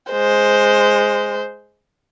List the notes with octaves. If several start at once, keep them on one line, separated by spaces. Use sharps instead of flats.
G#3 C5